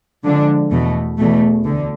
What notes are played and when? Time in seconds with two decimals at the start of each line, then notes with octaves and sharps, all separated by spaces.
0.24 D3 F3 G#3 D4
0.71 E2 B2 A3
1.17 E2 B2 A3
1.64 D2 D3